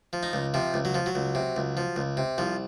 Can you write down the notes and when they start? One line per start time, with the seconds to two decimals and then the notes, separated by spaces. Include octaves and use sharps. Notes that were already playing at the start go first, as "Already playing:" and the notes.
0.13 F3
0.23 D#4
0.33 C#2
0.54 C3 F3
0.74 C#2
0.85 F#3
0.94 F3
1.06 F#3
1.15 C#2
1.35 C3
1.56 C#2
1.77 F3
1.96 C#2
2.17 C3
2.38 C2 F3